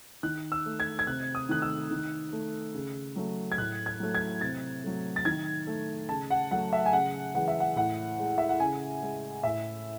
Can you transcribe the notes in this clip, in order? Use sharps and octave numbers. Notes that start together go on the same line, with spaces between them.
D#3 F#6
E6
A3
G#6
G#6
C3 F#6
D#6
D#3 A3 F#6
E6
D#3
A3
C#3
F#3 A3
G#6
A2 F#6
G#6
F#3 A3
G#6
C3 A6
F#3 A3
A6
D#3 G#6
A3
C#3 A5
F#5
F#3 A3 F#5
E5
G#5
C#3 F#5
E3 G#3 F#5
E5
F#5
A2 F#5
G#3
E5
F#5
C#3 G#5
G#3
A2 E5